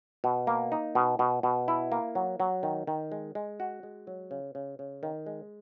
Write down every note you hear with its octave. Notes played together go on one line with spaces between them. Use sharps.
B2
A#3
D#4
B2
B2
B2
E4
A#3
F#3
F#3
D#3
D#3
G#3
G#3
F#4
G#3
F#3
C#3
C#3
C#3
D#3
G#3